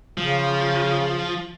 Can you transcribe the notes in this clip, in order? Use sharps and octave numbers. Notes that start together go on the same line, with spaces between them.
C#3 F3